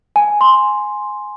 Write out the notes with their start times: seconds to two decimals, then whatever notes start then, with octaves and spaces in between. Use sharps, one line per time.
0.16 G#5
0.41 C6